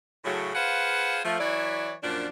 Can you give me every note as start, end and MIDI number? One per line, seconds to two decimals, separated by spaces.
0.24 0.51 45
0.24 0.51 49
0.24 0.51 54
0.55 1.19 65
0.55 1.19 68
0.55 1.19 71
0.55 1.19 72
0.55 1.19 77
0.55 1.19 78
1.24 1.39 53
1.24 1.39 57
1.40 1.92 52
1.40 1.92 54
1.40 1.92 64
1.40 1.92 73
1.40 1.92 74
2.03 2.27 42
2.03 2.27 46
2.03 2.27 53
2.03 2.27 62